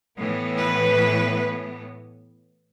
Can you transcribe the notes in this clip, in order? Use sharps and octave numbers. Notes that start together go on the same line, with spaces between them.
A2 E3 B3
B4